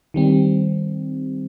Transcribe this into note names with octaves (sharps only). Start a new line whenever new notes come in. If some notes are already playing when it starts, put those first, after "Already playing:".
D#3 G3 C4